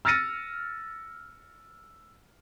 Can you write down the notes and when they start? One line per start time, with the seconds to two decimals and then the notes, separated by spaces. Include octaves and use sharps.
0.05 E6 F6 A6 A#6 C#7 D#7